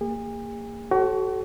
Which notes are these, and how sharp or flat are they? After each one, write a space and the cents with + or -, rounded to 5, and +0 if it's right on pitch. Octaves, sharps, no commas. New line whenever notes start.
A#3 -25 G#4 -40
F#4 +35 A4 -25 C#5 -45